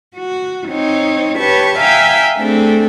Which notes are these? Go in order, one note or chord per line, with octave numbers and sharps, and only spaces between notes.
F#4
C4 D#4 C#5
G4 B4 C#5 A5 C#6
E5 F5 G5 G#5 A#5 E6
A3 C4 D4 G#4 A4